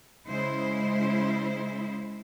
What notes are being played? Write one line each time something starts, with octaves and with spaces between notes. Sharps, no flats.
C#3 G#3 E4 C5